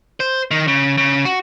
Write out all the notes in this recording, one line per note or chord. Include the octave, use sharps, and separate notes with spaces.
C5
D#3
C#3
C#3
F#4